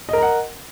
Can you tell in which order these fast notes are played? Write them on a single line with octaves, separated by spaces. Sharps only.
D#5 A#4 A#5 F#5